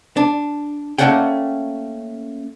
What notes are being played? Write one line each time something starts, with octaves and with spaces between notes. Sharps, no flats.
D4
A3 A#3 C#4 D5 F#5 G5